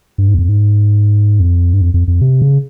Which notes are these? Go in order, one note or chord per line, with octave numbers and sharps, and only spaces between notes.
G2
G#2
E2
F2
G#2
F2
G2
F2
F2
F2
C3
C#3